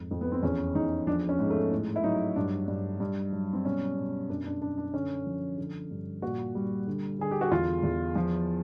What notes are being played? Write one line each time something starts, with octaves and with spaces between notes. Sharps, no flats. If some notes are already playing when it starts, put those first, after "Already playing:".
Already playing: F2 G#2
F2
B3
C4
E2 C#4
E2 D#4
F3 D4
C#4
G#2
A3
A2
E4
F#3 D#4
G2 D4
G2
G2
F#3
C4
B2 C#4
B2
F#2 D4
D4
F#2 D4
D4
D3 C#4
F3
D3
G2
A#2 F#4
G3
D3
D3 G#4
G4
F#4
E2 F4
E2
F3